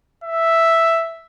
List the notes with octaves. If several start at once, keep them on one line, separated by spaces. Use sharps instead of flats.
E5